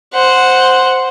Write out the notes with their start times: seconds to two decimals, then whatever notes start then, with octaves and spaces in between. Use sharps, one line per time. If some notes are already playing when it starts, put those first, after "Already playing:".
0.14 C5 F#5